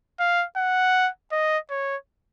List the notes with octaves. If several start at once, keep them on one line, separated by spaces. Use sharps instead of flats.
F5
F#5
D#5
C#5